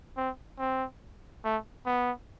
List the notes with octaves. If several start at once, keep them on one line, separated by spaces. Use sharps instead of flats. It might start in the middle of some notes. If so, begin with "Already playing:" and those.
C4
C4
A3
B3